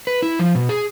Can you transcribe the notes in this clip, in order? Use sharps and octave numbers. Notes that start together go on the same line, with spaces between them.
B4
E4
F3
B2
G#4